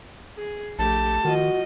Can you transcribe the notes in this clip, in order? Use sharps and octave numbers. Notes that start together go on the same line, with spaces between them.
G#4
A#1 A3 G4 A5
D#3 F3 F#4 D#5